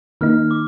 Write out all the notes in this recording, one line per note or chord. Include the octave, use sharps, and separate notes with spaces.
D#3 A#3 D#4 F6
D6